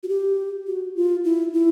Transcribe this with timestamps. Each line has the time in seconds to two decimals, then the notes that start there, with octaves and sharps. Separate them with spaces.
0.03 F#4
0.09 G4
0.67 F#4
0.96 F4
1.25 E4
1.53 E4